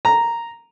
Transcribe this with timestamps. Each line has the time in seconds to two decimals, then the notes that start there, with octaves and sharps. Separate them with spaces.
0.05 A#5